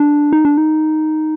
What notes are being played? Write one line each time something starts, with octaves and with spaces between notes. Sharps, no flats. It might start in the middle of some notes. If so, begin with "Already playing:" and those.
Already playing: D4
D#4
D4
D#4